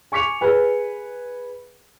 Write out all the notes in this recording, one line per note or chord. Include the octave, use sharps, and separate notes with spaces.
G#5 C#6 D6 B6 C#7 F7
G#4 B4 G#5